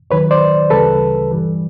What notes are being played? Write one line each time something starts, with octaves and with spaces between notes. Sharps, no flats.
D#2 D#3 F#3 B4 C#5
C5 D5
D2 C#3 E3 G3 A4 B4
G2 E3 G3